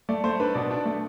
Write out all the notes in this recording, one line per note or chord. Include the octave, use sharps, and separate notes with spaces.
A3 D5
A3 C5
D4 B4
B2 D5
D4
A3